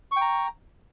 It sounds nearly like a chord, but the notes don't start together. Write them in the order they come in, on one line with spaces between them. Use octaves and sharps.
C#6 G5 A#5